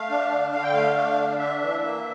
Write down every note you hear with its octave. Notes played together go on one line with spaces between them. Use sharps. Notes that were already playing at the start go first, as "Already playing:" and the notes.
Already playing: A3 F5
D4
D3
D3 F5
G5
A3 F5
D4
D3
D4 E5
E3
A#3